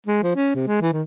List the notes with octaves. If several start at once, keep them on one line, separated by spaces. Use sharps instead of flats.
G#3
F3
C#4
C3
G#3
E3
D#3